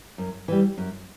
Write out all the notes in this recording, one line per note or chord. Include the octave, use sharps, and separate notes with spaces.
F#2
E3 G3
F#2